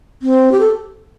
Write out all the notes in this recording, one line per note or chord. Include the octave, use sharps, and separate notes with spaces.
C4
G4
A4